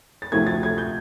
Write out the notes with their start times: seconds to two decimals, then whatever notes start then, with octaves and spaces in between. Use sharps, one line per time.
0.22 A6
0.32 D2 C3 F3 A3 C4 G#6
0.47 A6
0.63 G#6
0.78 G6